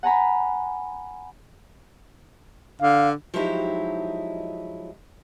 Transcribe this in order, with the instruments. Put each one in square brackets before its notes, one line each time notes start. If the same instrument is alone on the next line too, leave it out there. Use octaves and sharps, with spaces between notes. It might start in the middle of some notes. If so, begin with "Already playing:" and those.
[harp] F#5 G#5 A#5 B5
[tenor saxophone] D3 [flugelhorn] F5
[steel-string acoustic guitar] F3 F#3 G#3 D#4 E4 G4